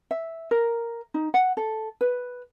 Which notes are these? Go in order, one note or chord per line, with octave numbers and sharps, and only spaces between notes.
E5
A#4
D#4
F#5
A4
B4